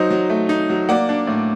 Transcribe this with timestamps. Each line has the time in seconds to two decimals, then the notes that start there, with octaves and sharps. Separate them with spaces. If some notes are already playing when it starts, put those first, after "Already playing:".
Already playing: F#3 D#4 C5 D#5
0.10 F#3
0.30 A3
0.49 D#4
0.70 F#3
0.89 A#3 D5 F#5
1.09 D4
1.27 A2